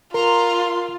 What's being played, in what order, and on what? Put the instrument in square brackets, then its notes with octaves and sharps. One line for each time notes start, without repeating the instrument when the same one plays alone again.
[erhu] F4 [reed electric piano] A#4 [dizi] A#5 [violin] C6